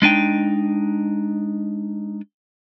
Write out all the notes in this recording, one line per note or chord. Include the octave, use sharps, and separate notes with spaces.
G#3 D4 D#4 G5